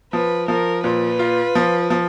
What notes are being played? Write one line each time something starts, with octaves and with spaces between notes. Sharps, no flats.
F3 B4
F3 A#4
A#2 B4
F4
F3
F3